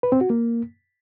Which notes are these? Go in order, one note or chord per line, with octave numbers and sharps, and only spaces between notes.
B4
C4
F#4
A#3